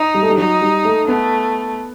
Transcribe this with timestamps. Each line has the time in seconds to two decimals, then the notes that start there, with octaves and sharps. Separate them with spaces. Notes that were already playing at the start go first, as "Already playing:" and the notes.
Already playing: D#4
0.15 G3
0.23 A3
0.30 G3
0.38 F#3 D#4
0.61 G3
0.85 A3
1.08 A3 B3